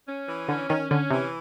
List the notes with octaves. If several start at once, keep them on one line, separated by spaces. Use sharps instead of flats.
C#4
E3
D3 C#4
D#3 C#4
D3 C#4
C3 E3